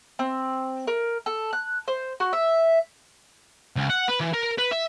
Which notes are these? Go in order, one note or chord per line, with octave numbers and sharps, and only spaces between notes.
C4
A#4
A4
F#6
C5
F#4
E5
C#2
F#5
B4
E3
A#4
B4
E5